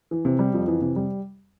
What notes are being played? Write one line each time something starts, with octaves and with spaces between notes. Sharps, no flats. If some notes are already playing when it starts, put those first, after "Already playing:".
E3
C3
G3
F2
E3
C3
G3